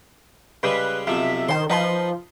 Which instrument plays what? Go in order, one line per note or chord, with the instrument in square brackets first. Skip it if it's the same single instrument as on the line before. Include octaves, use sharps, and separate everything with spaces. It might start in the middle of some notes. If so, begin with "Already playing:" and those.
[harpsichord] C#3 G3 G#3 [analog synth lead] B4
[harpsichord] B1 C3 F3 [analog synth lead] E5
[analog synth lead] D#3 [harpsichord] C5 C6
[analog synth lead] F3 [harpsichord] D#4 B4 C6